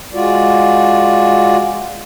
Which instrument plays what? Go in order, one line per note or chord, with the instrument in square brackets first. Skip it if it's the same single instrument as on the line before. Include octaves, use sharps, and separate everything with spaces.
[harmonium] G#3 F4 F#4 D5